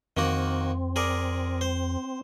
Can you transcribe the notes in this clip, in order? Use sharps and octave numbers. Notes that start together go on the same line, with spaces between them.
F2 D#3 A#3 C4 F#4
G#4 A#4 D5
C5